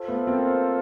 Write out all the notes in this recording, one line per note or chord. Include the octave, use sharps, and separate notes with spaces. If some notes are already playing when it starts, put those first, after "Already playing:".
Already playing: F4 A4 C5
A3 B3
A#3 C4